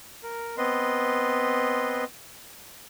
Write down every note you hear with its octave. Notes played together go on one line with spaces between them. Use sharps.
A#4
B3 C4 B4 D#5 C6